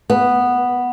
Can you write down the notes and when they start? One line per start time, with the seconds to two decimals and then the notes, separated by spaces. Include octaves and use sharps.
0.10 B3